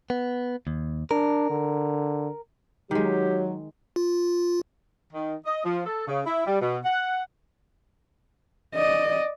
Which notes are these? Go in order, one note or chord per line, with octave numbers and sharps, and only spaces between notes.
B3
D#2
D4 A#4
D3
D#3 F#3 G#3 G4
F4
D#3
D#5
F3
A4
C#3
E4
G3
B2
F#5
D5 D#5